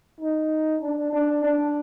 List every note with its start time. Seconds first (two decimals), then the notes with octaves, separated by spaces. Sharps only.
0.21 D#4
0.81 D4
1.13 D4
1.44 D4